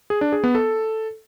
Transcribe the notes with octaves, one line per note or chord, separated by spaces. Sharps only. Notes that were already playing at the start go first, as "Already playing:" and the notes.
G#4
D4
G#4
B3
A4